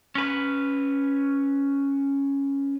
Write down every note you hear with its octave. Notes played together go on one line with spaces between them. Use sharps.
C#4 B4